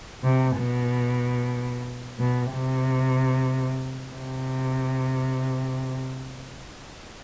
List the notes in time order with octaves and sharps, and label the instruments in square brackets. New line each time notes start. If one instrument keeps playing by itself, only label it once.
[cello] C3
B2
B2
C3
C3